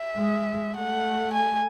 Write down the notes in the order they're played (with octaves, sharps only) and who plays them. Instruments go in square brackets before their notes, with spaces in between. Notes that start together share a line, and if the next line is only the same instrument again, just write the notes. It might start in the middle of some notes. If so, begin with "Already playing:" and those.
Already playing: [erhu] E5
[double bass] G#3
[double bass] A3 [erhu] F#5
[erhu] G#5